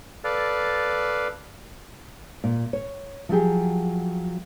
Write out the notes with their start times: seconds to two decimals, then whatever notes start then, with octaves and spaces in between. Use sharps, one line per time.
0.24 A4 B4 D5 F5
2.44 A#2
2.73 C#5
3.29 F3 F#3 G4 G#4